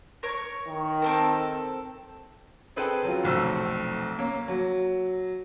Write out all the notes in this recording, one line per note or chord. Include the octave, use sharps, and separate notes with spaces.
A#4 C#5
D#3
C4 A4 A#4
C4 G#4 A4 B4 C5 G5
C#3 F#3 F4
F1 B1 A3 C4 E6
A#3 C#4
F#3